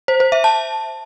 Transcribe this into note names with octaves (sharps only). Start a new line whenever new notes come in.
C5
C5
E5
A5